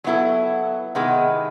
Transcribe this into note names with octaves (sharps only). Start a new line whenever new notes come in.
F#3 B3 E4 A4
C3 D#3 G#3 B3 E4